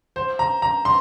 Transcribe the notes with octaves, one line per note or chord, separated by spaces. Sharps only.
C5
A#5
A#5
C6